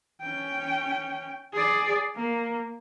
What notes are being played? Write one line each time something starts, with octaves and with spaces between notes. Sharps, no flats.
C#4 G5
G#4 D5
A#3